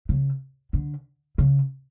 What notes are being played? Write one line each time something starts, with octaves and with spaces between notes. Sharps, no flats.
C#3
D3
C#3